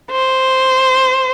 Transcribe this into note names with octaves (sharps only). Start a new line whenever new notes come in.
C5